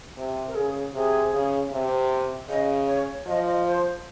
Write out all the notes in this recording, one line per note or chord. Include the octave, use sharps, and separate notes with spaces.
C3
A#4
C#3 G#4
C3 G#4
C#3
C3
C#3 D#5
C#5
F3 D#5
D#5
C5